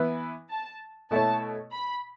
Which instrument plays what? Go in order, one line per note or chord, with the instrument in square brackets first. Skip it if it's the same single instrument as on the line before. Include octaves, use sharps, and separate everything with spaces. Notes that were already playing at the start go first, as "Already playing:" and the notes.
Already playing: [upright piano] E3 B3 E4 B4
[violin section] A5
[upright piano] B2 A3 E4 A4 C#5 [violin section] A5
[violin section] B5